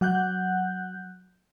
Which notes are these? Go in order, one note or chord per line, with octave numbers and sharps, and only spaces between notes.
F#3 F#5 F#6 G6